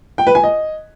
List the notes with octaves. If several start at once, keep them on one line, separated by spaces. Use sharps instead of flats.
G5
B4
G#5
D#5